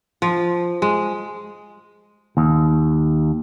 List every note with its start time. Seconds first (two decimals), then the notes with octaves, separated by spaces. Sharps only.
0.22 F3
0.82 G#3
2.37 D#2